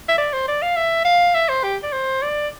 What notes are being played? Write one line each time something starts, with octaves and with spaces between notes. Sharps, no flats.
E5
D5
C5
D5
F5
E5
F5
E5
C5
G4
D5
C5
D5